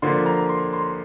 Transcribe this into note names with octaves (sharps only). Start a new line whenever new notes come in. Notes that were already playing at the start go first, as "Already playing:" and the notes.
D3 F3 A#3 C6
A#5
C6
C6